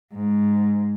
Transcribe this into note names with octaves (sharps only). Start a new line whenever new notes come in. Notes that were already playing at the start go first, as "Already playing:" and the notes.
G#2